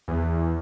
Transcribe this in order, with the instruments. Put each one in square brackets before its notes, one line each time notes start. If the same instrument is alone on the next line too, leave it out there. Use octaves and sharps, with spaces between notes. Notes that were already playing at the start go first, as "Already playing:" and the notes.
[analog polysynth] E2